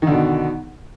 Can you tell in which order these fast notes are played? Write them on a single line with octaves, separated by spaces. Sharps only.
D#3 D3 B2